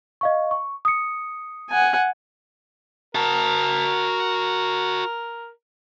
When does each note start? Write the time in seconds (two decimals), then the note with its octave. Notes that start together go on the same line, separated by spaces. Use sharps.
0.21 D#5 F5 C#6
0.51 C#6
0.85 D#6 C#7
1.70 F#5 G#5
3.15 F#4 A#4 A5